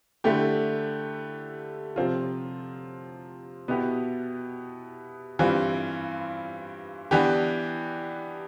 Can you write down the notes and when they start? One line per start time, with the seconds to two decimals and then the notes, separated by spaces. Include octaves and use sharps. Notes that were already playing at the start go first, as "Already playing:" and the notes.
0.24 D3 A3 E4 G4
1.96 C3 F3 C4 F4
3.68 B2 B3 E4 G4
5.39 G2 E3 G3 C4 F4
7.11 E3 B3 D4 G4